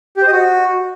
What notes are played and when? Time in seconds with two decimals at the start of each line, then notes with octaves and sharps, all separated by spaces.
0.17 G4
0.22 C5
0.27 D#5
0.32 F#4